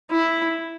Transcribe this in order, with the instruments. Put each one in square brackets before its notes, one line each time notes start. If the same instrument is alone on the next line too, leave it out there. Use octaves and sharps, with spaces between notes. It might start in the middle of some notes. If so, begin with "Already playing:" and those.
[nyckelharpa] E4